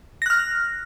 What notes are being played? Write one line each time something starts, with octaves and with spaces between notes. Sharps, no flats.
F6 F#6 A#6